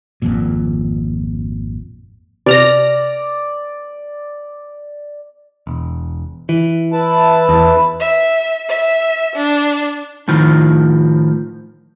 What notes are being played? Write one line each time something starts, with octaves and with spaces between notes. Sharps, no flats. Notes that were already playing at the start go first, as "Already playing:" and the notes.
G#1 F2 A#2
C3 D5 F6 A#6
E1
E3
E4 B4 A5
E2
E5
E5
D4
A2 D#3 F3